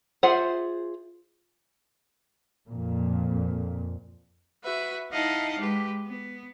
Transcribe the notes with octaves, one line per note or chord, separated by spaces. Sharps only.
F4 G#4 C5 E5 F#5
F2 A#2
F#4 B4 E5
D#4 E4 D#5 F5 F#5 A5
G#3 G4 B4
B3